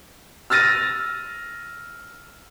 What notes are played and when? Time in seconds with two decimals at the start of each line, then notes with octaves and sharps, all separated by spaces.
0.50 E6 F6 A6 A#6 D#7